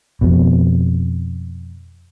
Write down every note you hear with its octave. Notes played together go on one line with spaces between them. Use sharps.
F2 B2